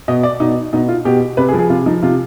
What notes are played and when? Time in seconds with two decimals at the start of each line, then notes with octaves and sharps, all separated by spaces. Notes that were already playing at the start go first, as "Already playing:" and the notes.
0.08 B2 D#5
0.23 D5
0.40 B2 D#4
0.73 B2 D#4
0.89 F4
1.05 B2 G4
1.37 C3 B4
1.48 G#4
1.53 F3
1.59 G#4
1.70 C3 F4
1.86 F3 D#4
2.02 C3 F4